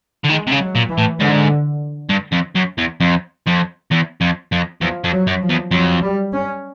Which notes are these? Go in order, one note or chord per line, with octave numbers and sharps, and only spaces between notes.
D3
D#3 G#3
C3
C#3
F#3
A#2
E3
A2
G#2 D3
G2
F2
F#2
E2
F2
F2
E2
F2
F2
E2 F3
F2
F#3
F#2
F3
E2
F2 F#3
G3
C#4